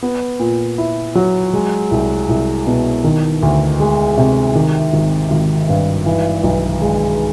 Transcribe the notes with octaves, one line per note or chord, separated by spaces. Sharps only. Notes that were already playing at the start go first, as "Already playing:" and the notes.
B3
A#2
E4
F#3
G#3
C2
C2
B2
D#3
D2
G#3
C3
D#3
G#1
G#1
G2
E3
B1
G#3